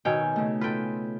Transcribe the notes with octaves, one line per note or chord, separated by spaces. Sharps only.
B2 D#3 C#5 G5 G#5 E6
C#3 A3
F4 A4 B4 G5